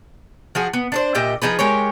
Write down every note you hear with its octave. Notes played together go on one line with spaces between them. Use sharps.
F3 F#4 G#4
B3
D4 B4 C5
A#2 G4 D#5 E5
F3 D#4 G#4 B4
G#3 G4 A#4 C#5